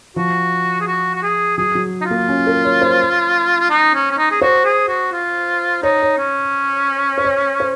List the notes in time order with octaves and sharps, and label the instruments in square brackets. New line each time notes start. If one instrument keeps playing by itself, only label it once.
[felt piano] F3 [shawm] F#4
[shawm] G#4
F#4
F#4
G#4
[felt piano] F#3 [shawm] G#4
[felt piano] F#3
[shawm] D#4
F4
[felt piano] A#3
C#4
A#4
C#5
C5
[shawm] F4
D#4
C#4
C#4
D#4
G#4
[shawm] F#4 [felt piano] C5
[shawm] G#4
F#4
F4
[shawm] D#4 [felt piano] C#5
[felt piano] C#5
[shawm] C#4
[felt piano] C5
C#5
C5